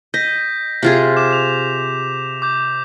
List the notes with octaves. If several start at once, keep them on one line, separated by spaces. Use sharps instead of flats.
D#5 G6 A#6 B6
C3 F4 G#4
D6 E7
F7
D6 G6